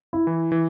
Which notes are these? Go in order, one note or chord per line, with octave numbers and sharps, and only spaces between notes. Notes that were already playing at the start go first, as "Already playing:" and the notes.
E4
E3
E3